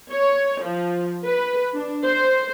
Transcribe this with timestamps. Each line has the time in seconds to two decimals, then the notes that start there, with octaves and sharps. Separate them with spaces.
0.12 C#5
0.63 F3
1.25 B4
1.74 D4
2.04 C5